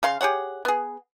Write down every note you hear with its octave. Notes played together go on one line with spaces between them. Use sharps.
C#3 F5 C6
G4 G#4 C#5 F#5
B3 G#4